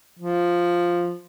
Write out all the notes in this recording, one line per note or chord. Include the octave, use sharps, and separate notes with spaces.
F3